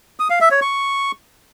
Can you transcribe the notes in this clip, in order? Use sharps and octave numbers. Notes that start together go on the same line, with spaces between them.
D#6
F5
E5
C#5
C#6